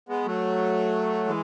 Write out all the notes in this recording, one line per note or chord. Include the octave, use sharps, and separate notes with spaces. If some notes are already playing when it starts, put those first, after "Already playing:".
G#3 B3
F#3 A3
E3 G#3